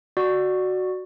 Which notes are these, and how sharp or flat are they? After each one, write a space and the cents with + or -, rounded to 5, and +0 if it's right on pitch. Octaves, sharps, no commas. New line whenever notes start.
F#4 +0 D5 +15 C#6 +0